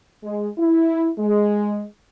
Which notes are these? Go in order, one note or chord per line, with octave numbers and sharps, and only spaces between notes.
G#3
E4
G#3